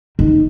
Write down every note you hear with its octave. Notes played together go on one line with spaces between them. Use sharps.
D#3